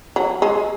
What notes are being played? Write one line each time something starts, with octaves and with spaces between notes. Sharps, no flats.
F#3
G#3